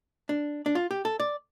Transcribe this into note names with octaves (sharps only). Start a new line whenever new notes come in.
D4
D4
F4
G4
A4
D5